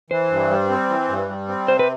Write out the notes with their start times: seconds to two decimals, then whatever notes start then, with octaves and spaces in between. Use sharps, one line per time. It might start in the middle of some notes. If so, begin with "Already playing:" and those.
0.10 E3 C5
0.30 G2
0.50 G3
0.70 C4
0.89 E3
1.09 G2
1.29 G3
1.48 C4
1.68 C3 C5
1.79 B4